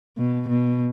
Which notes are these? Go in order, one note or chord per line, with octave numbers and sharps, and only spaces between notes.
B2
B2